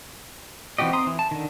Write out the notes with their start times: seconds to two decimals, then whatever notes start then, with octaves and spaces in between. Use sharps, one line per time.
0.78 E3 C4 F#4 G4 D#5
0.93 C4 A#5 C6 D#6
1.07 E3
1.19 A5
1.31 D3 D#3